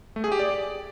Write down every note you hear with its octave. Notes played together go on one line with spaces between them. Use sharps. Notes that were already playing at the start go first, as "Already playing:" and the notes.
A3
G#4
G4
D5